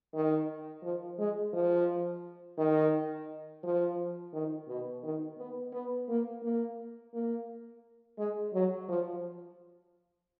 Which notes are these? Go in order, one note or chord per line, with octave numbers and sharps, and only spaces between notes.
D#3
F3
G#3
F3
D#3
F3
D#3
B2
D#3
B3
B3
A#3
A#3
A#3
G#3
F#3
F3